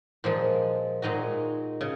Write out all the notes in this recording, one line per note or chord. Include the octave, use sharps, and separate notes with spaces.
A#2 F3 G#3
A#2 G#3 D#4 F#4
C#3